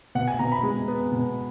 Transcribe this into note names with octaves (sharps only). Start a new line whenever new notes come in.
B2 F#5
G#5
B2 A#5
B5
G#3
B3
B2